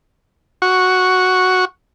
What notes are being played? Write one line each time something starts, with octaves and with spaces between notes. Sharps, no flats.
F#4 C#6